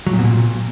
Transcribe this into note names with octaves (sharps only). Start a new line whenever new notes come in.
F#3
A#2
B2
A#2